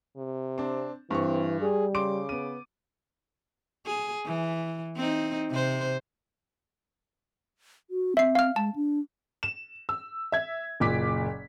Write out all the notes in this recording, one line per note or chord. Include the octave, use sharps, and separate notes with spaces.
C3
C4 D4
G2 E3 C4 C#6
G3 G#4
C#3 C6 D6 D7
B3 D#7
G#4
E3
C4 D#4
C3 C5
F#4
C4 E5 C7
F5 F6
G#3 A5
D4
E7
E6
E5 G#6
F#1 A#2 D6 B6